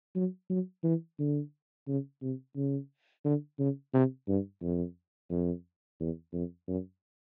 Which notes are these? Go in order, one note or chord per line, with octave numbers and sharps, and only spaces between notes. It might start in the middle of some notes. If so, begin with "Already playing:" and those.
F#3
F#3
E3
D3
C#3
C3
C#3
D3
C#3
C3
G2
F2
F2
E2
F2
F#2